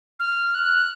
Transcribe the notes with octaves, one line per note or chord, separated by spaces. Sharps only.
F6
F#6